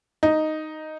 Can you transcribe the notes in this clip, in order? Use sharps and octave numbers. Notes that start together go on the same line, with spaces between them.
D#4